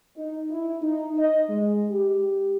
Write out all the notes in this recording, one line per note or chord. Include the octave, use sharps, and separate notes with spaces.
D#4
E4
D#4
D#5
G#3
G4